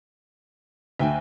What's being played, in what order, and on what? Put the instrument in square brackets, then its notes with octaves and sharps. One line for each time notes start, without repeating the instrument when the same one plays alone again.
[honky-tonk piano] D2 [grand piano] E5 G5 G#5